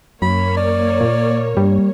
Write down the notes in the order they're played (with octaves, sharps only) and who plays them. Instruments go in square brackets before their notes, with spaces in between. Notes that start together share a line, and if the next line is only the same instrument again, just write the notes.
[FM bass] F#2 [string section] A#3 C#5 [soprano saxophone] B5
[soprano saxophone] D5
[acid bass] A#2
[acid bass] G2 [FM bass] G3